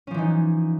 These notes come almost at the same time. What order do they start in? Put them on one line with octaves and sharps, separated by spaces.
C#4 F3 E3 D#4